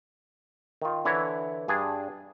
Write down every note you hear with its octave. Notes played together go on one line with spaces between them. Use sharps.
D#3 F4
D3 E3 E4 C#5
G2 D4 G#4 G#5